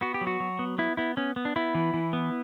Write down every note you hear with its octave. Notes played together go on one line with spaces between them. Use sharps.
B3 F#4
G4
F#3
F#4
F#3
B3
B3 E4
B3 E4
B3 C#4
B3
D4
B3 E4
E3
E3
B3